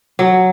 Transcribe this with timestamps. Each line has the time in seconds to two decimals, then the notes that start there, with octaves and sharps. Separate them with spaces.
0.19 F#3